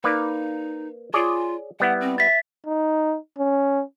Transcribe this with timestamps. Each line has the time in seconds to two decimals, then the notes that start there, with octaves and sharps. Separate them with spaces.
0.04 A#3 D#4 B4 D5
1.14 F4 G#4 C#5 D5
1.80 G3 B3 E4 F#5
2.01 C4
2.18 E5 A6 B6
2.66 D#4
3.38 C#4